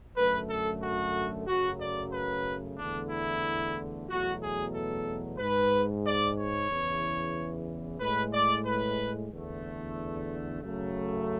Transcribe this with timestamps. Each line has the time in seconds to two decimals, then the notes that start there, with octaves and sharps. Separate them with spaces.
0.17 F#2 D3 A3 B4
0.49 A4
0.83 F#4
1.47 F#2 C#3 F#3 A3 F#4
1.80 D5
2.12 B4
2.78 E2 D3 A3 D4
3.10 E4
4.08 E2 B2 F#3 A3 F#4
4.42 G#4
4.73 A4
5.38 G#2 G#3 B4
6.04 D5
6.38 C#5
6.69 E2 C#3 E3
8.00 A2 G#3 B4
8.33 D5
8.65 B4
9.30 E2 D3 A3
10.61 F#2 C#3 F#3 A3